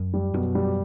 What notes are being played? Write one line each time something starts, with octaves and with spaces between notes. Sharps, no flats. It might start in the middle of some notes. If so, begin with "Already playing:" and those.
Already playing: F#2
G3
F#2 B2
G3